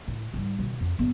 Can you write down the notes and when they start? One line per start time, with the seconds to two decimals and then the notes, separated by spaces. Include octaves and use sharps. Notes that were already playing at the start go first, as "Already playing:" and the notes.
0.08 A2
0.34 G#2 G3
0.59 B2 D#3
0.81 F2
0.99 G2 B3